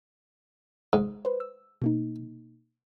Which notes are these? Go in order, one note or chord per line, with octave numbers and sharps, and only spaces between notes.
G#2
B4 C5
E6
B2 A#3 D#4